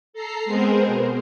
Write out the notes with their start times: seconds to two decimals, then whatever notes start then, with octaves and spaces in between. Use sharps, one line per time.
0.13 A4 A#5 C7
0.45 G#3 B3 C4 G#4 A#4 C5
0.86 B2